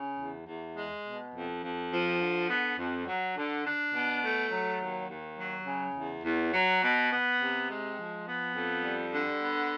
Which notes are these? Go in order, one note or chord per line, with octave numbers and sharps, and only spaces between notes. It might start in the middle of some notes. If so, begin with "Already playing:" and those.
Already playing: C#3
E2
E2
G#3
B2
F2
F2
F3
D3
B3
F2
F#3
D3
D4
B2
A3
F#3
D#2
D#2
F#3
C#3
E2
E2
F#3
B2
B3
C3
G#3
F3
B3
F2
G3
D3
B3